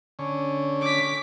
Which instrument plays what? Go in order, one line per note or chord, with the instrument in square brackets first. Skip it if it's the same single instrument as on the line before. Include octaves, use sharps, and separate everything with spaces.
[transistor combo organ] D3 C#4
[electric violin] D6 B6